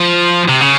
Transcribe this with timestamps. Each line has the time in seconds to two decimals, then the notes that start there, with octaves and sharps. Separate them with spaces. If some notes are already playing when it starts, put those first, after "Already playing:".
Already playing: F3
0.48 C3
0.61 C#3